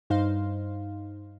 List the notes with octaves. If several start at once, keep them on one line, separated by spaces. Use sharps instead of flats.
G2 D#4 C5 F5